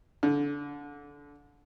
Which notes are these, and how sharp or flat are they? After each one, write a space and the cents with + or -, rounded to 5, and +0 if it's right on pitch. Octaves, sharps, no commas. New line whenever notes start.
D3 -25